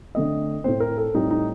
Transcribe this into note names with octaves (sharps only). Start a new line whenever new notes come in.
D3 A3 C4 D#5
A2 A3 C4 C5
A#4
A4
A2 G3 C4 D#4
D#4